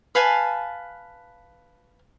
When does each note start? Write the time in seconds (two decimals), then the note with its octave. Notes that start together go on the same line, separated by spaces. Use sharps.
0.15 B4 F5 G#5 A5